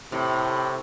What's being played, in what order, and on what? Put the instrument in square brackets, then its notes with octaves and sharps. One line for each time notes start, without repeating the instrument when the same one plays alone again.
[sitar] A2 [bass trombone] C3